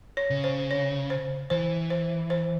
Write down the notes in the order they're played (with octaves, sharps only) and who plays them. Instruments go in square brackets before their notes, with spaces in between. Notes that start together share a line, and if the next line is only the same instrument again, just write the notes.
[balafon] C#5
[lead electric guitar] C#3
[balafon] C5
C#5
C5
[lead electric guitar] E3 [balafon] C5
[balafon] C5
C5